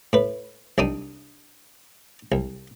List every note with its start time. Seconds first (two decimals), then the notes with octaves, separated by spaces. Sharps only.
0.13 A2 B4
0.78 C2 D4 D#4 D#6
2.32 C2